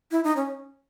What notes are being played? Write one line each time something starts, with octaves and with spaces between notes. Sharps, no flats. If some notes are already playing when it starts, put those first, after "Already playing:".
E4
D#4
C#4